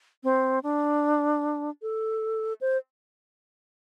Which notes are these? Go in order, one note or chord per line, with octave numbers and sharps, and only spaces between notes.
C4
D4
A4
C5